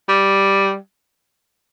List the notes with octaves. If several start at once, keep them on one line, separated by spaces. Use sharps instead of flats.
G3